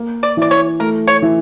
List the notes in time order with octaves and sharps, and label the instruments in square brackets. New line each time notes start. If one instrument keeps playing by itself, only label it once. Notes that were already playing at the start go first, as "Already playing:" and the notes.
Already playing: [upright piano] A#3
[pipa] D5
[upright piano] E3 [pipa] D5
[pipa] C#5
[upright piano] A3 [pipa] A#4
[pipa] C#5
[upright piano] E3